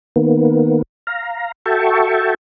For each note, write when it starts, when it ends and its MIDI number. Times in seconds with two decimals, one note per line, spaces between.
0.16 0.82 51
0.16 0.82 58
0.16 0.82 59
1.07 1.52 77
1.07 1.52 82
1.66 2.34 66
1.66 2.34 69
1.66 2.34 76
1.66 2.34 79
1.66 2.34 81
1.66 2.34 85